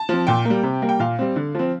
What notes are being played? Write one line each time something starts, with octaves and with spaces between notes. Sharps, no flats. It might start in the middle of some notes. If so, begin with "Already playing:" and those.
Already playing: A5
F3 C4
A#2 G5
A#3
G3
C3
G3 A#3
G5
A#2 F5
G3 C4
D3
F3 C4